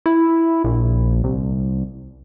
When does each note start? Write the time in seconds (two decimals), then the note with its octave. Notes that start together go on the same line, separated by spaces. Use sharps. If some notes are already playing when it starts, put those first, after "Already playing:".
0.06 E4
0.64 A#1
1.24 C2